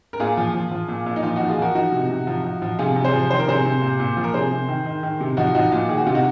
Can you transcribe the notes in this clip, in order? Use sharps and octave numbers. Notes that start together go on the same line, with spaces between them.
A#4
A#2 F4 G#4
F3
F3
F3
A#2
A#2
D#4
F3 F4
F3 D#4 F#4
F4 G#4
F3 F#4 A#4
F3 D#4 F#4
C3
C3
F3
F3
F3
C3 F4 G#4
C3
G#4 C5
F3
D#3 C5
A#4
C3 G#4 C5
C3
A#2
A#2
F3
A#4
C3 G#4 C5
C3
D#3
D#3
D#3
C3
F3 D#4 F#4
F3 D#4 F#4
A#2 F4
D#3 G#4
F#4
C3 F4
D#4 F#4